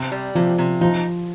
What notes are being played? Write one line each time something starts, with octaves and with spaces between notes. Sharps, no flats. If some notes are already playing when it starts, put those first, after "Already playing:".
Already playing: C3
G3
C3 F3
C3
F3 D#4